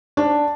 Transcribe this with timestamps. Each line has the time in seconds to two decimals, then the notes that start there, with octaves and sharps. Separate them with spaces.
0.17 D4